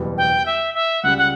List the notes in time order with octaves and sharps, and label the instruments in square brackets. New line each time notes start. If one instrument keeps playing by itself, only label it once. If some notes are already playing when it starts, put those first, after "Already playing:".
Already playing: [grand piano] F#1 E2 B2 G3 B3
[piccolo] G5
E5
E5
[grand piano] C#2 C#3 G3 [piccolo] F#5
[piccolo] F#5